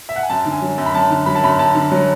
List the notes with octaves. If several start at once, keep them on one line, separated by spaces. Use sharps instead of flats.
E5
F#5
G#5
F#2 A5
D3
G#5
F#3
F#2
B5
F#2 A5
D3
F#3 B5
A5
F#2 B5
F#2 A5
D3
F#3